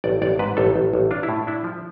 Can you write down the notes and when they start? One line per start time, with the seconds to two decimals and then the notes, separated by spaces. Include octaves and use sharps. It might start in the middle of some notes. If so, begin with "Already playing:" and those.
0.04 A1 D5
0.22 A1 D5
0.39 G#2 B4
0.57 A1 A4
0.76 A1
0.93 A1
1.11 D4 F4
1.23 E4
1.29 A2
1.47 D4 E4
1.64 F3